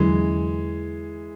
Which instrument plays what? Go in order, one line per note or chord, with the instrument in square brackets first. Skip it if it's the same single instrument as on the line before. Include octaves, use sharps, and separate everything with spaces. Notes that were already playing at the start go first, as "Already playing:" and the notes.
Already playing: [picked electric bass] E2 D3 F#3 C#4 [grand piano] E3 G#3